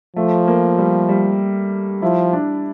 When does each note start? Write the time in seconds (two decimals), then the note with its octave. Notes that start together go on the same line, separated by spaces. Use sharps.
0.16 F3 A3
0.48 A#3
0.78 G3
1.09 G3
2.02 F3 E4
2.33 D4